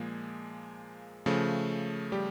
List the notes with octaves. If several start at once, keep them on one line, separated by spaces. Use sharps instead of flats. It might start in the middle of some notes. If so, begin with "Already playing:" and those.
Already playing: A#2 F3 G#3 A#3 G#4
C#3 F3 A3
G3 G4